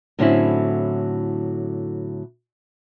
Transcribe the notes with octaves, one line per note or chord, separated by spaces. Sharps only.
A2 D3 F#3 C4 C#4 E4